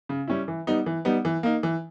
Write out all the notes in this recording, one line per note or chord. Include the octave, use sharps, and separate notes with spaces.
C#3
G3 C#4 E4
E3
G3 B3 D#4
E3
G3 B3 D#4
E3
A#3 D#4
E3